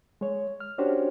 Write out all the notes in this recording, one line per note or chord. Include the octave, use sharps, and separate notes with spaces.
G#3 C#5
F6
C#4 D4 F#4 G4 C5 C#5